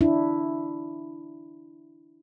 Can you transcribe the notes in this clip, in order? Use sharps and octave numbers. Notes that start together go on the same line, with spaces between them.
D4 E4